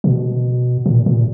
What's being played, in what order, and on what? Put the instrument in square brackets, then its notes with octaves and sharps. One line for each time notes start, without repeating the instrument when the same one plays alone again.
[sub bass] B2
A#2
A#2